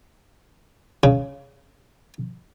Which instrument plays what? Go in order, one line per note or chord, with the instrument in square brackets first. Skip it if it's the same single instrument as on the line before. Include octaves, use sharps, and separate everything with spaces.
[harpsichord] C#3